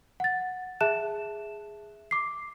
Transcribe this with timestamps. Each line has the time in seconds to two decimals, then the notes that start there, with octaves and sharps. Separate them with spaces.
0.20 F#5 A6
0.81 G#4 E5 A5 F#6 E7
2.11 D6 C7